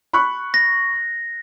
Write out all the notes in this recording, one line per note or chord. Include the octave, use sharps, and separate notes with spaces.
B5 C#6 F#6
A#6